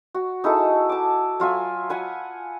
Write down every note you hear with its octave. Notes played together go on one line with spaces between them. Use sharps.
F#4
D#4 E4 G#4 A4
A5 D6
F#3 F4 E5 G#5
F4 F#5 G#5 B5